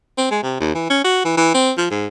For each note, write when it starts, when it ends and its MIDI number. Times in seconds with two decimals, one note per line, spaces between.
0.18 0.31 60
0.31 0.40 56
0.43 0.57 48
0.60 0.71 39
0.75 0.85 52
0.90 1.01 61
1.04 1.23 66
1.25 1.35 52
1.37 1.50 52
1.54 1.72 60
1.78 1.87 53
1.90 2.07 44